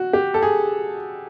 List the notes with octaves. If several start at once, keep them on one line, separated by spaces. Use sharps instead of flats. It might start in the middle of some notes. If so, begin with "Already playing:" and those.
Already playing: F#4
G4
A4
G#4